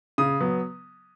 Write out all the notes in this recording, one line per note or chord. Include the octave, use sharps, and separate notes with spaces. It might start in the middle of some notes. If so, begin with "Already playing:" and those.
C#3 D#6
F#3 B3